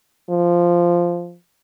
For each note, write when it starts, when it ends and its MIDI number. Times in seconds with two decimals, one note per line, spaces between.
0.30 1.36 53